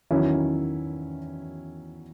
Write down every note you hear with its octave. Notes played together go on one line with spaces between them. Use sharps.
E2 D#3 F#3 C#4 E4